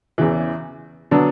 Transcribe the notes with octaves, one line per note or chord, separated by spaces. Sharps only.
E2 C#3 E3
D3 F#3 B3 D4